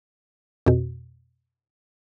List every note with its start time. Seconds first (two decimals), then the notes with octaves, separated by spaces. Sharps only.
0.66 F2 B2